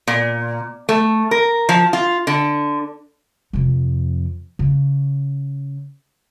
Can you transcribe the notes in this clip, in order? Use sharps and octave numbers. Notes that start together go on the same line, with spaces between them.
A#2
A3
A#4
F3
F4
D3
F2 C3
C#3